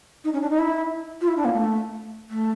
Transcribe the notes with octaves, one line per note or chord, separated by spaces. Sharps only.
D#4
C#4
D4
D#4
E4
F4
E4
D4
A#3
A3
A3